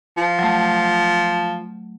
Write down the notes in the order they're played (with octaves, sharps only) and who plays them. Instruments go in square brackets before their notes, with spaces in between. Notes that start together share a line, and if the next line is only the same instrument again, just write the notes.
[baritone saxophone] F3
[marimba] F#3 A3